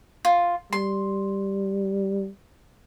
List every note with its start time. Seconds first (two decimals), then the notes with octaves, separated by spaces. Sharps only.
0.25 F4
0.73 G3 C6